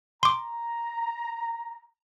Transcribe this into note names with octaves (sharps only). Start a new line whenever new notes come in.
A#5 C6 D6